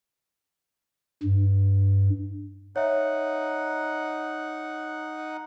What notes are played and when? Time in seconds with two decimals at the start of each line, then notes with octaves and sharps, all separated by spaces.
1.23 G2
2.76 D#4 C#5 E5 F#5